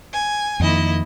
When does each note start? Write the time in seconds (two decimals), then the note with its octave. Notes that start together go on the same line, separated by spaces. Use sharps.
0.14 G#5
0.60 F2 D#3 A#3 E4 D#5